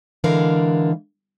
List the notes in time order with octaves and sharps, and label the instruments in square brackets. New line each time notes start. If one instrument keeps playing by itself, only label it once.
[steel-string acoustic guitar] D3 E3 G#3 D4 A#4 F5